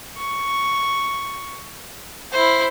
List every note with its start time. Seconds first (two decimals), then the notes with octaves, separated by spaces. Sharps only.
0.18 C#6
2.32 E4 C5